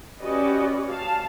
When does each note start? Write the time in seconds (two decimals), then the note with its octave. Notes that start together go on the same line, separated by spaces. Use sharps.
0.22 C#4 F#4 G4 B4 D5 D#5
0.91 F5 A5